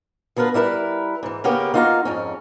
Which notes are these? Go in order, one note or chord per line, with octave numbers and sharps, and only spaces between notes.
D3 B3 F4 A#4 B4
G3 E4 A#4 B4
G#2 E3
C#3 A#3 B3 C#4 G4 A#4
A#3 D#4 F4 F#4 F#5 A#5
F2 G#2 C#4